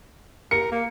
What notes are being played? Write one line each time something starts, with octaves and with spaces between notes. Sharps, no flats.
A#4 C#7
A#3